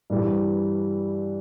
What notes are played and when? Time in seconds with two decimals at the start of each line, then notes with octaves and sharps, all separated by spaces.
0.10 G2 E3 G3